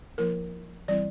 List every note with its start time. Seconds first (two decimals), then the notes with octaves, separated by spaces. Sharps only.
0.18 F3 A#3 E4 A#4
0.88 E3 G3 C4 E4 D5